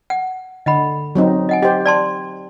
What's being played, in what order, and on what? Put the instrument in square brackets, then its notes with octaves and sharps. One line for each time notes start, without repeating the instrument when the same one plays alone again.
[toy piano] F#5
[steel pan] D3 [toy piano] D#5 F#5 B5
[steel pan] F#3 C4 D#4
[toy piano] D#5 F#5 G#5
[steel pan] G4 C5 [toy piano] D#5
[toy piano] D5 A5 C6